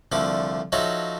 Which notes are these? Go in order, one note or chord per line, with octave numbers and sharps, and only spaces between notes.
C2 D3 F3 A3 D6
F3 F#3 D#4 A4 C#5 E5